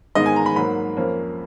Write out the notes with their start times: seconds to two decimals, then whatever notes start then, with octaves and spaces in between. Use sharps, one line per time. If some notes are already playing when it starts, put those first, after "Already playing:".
0.15 G#2 D#3 G#3 B3 D#5
0.26 G#5
0.36 A#5
0.46 B5
0.56 G#2 F#3 A#3 B5
0.97 F2 F3 A#3 C#4